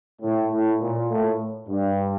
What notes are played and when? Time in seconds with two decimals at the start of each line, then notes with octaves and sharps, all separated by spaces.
0.22 A2
0.51 A2
0.81 A#2
1.10 A2
1.68 G2